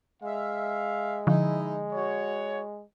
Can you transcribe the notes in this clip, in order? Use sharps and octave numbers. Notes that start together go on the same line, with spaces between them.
G#3 E5 F5
D3 F3 D#4 E4
F#4 C#5